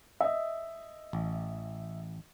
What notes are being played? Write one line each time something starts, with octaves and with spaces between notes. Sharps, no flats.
D#5 E5
A1